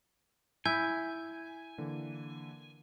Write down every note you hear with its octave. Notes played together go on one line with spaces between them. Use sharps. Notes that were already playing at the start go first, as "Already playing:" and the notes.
E4 G#5 G6
D3 E3 A#3